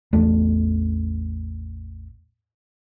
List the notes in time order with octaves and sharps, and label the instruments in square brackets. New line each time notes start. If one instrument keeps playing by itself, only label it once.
[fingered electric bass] A1 E2 A3 D4